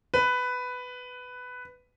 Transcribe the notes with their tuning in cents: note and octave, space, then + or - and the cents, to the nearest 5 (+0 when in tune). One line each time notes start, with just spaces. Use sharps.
B4 +10